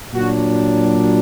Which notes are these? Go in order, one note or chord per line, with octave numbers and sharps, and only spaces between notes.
A#2 F#3 D4 F#4